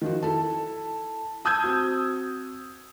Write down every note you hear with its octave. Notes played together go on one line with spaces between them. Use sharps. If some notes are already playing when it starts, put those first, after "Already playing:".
D#3 F3 F#4
E4 A4 A5
A5 D#6 E6 G6 G#6
C4 F#4